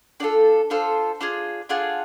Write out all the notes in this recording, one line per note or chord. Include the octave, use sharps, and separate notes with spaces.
D4 F4 A4 D5
D4 F4 A4 C5
D4 F4 G#4
D4 F4 G#4 F#5